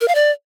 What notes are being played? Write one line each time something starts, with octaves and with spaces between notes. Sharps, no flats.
A#4
F5
D5